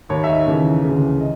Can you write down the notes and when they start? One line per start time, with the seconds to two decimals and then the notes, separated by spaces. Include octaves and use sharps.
0.09 D#2 D#3 C#5
0.24 E5
0.28 D#5
0.46 D#2 C#3 E3
0.83 D2 C#3 E3
1.20 D#5